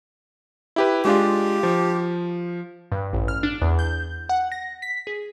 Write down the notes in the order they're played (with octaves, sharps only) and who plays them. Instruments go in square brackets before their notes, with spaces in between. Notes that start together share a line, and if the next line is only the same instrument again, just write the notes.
[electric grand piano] E4 G4 B4
[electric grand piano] G#3 D4 F4 [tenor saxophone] G4
[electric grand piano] F3
[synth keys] G2
A1
F6
D4
E2
G6
F#5
A#6
B6
G#4